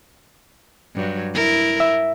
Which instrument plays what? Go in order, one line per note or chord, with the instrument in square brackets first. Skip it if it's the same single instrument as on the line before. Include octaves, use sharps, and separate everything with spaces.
[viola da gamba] G2 F#3
E4 A#4
[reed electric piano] E5